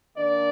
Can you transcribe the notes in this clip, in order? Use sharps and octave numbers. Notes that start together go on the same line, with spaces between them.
D#3 A#3 D4 D5